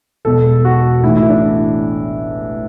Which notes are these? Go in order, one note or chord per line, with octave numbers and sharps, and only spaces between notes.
E1 E2 B2 A4
F#4
A1 A2 E3 E4
E4
D4